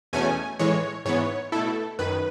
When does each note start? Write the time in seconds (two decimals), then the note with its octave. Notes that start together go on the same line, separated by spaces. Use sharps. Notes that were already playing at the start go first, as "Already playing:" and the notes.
0.13 E2 B2 A3 C#4 G#5
0.59 A2 E3 G#3 C#5
1.05 G#2 E3 B3 C#5
1.52 B2 A3 E4 A4
1.99 F#2 D#3 B4